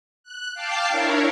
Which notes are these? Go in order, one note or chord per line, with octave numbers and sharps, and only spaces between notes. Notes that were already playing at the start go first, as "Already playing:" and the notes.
F#6
F5 G5 A5 D6 C7
D4 E4 A#4 C#5